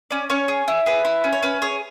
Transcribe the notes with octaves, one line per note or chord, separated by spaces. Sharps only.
C#4 D5
C#4 C#5
G#4
E4
G#4 B4
E4
C#4
C#5
C#4 B4
G#4 C#5